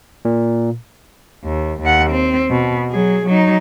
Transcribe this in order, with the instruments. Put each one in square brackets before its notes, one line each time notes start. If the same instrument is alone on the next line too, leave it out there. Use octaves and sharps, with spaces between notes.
[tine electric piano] A#2
[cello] D#2
D#2 F#5
C4
B2
F#3 G#4
F#3 D#4